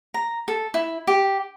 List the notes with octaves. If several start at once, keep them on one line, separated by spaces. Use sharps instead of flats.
A#5
A4
E4
G4